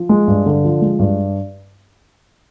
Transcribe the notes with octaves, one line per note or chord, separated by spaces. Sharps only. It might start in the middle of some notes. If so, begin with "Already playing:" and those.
Already playing: F3
G#3
G2
D3
F3
G#3
G2